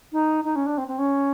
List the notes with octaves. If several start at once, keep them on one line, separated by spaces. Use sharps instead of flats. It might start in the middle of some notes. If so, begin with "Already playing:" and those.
D#4
D#4
C#4
D4
C4
C4
C#4